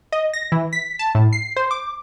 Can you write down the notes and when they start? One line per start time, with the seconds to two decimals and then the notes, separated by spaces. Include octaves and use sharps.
0.12 D#5
0.33 A#6
0.52 E3
0.73 B6
0.99 A5
1.15 A2
1.33 C7
1.56 C5
1.71 D6